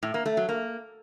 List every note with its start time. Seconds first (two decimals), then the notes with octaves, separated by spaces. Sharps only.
0.03 A2
0.14 A#3
0.26 A3
0.37 F#3
0.49 A#3